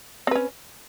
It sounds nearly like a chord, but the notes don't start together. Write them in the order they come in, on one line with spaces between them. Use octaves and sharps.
C4 B4 C#4